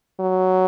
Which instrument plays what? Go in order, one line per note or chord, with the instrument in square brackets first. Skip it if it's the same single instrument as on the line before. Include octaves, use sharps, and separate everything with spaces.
[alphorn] F#3